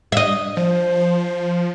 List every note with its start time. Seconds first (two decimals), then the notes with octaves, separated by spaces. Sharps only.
0.12 D#5 E5
0.57 F3 C5